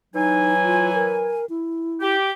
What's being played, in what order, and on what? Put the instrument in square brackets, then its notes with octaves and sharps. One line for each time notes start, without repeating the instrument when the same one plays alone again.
[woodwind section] E3 F#3 G#5 [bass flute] D#4
[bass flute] F4
A#4
E4
[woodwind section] G4